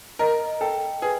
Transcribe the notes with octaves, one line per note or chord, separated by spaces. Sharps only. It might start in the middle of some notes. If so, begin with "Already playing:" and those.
A#4 D#5
A4 G5
G#4 B4